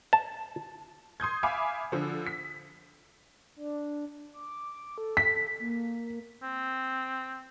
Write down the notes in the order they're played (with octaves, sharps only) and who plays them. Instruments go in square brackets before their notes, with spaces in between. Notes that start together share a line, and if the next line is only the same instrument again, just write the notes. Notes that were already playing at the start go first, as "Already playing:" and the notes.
[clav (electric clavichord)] A5
[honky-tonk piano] C6 D#6 G6 G#6
E5 F5 G#5 B5 D6
D3 F3
B6
[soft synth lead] D4
D6
A4
[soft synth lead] A4 [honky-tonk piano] B6
[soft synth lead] A#3
[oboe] C4